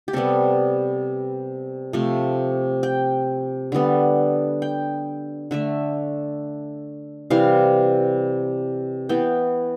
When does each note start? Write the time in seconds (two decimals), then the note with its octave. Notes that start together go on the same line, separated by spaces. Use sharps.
0.08 G4
0.13 C3 G3 B3 A4
1.93 C3 F3 A3
2.83 G5
3.72 D3 G3 B3
4.62 G5
5.51 D3 A3 E5
7.30 C3 E3 G3 F5
9.09 E3 B3 G5